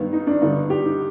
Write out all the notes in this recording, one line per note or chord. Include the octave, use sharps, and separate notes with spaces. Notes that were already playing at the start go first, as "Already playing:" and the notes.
Already playing: G2 D#3 B3
D#4
D4
G2 D3 G3 B3 D#4
G4
D#4